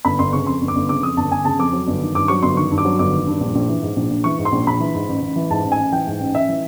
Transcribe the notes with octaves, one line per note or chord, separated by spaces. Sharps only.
G1 B5
G1 C6
C#3 C#6
F2 C6
G1
D6
G1
C#3 D6
F2 D#6
G1 A5
G1 G#5
C#3 A5
F2 D6
F#3
G1
D#3
G2 D6
F#3 C#6
G1 C6
D#3 C#6
G2
D6
F#3
G1 D6
D#3
G2
A#1
A#1
E3
G#2
A#1
A#1
E3 C#6
G#2
C6
A#1
A#1 B5
E3
G#2
A1
A1
E3
G#2 A5
A1
G#5
A1
E3 G5
G#2
A1
A1 E5
E3